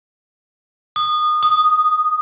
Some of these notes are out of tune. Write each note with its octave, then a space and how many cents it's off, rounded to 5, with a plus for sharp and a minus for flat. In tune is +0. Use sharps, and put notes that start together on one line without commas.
D#6 -25
D#6 -5